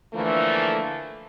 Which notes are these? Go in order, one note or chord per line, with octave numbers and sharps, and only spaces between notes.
D3 E3 F3 A3 A#3